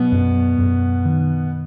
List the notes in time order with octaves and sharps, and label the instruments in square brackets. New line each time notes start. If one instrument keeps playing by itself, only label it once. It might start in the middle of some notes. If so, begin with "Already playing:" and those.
Already playing: [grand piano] B2 B3 [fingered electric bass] F#3
[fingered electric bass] F#2
F#2
D#3